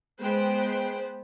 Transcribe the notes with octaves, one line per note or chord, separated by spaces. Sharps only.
G#3 B3 B4 C5 G5